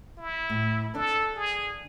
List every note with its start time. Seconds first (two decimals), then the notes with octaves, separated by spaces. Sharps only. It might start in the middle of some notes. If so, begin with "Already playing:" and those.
0.18 E4
0.50 A2
0.95 D3 D4 A4
1.36 G#4